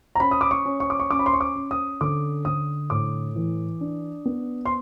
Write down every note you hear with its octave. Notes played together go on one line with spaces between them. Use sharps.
A#5
C#4 B5
D#6
D6
C#6
C#4
C#6
D6
C#6
C#4 D6
B5
C6
C#6
D6
C#4
D#6
D3 D6
D3 D#6
A2 D6
E3
D4
B3
C6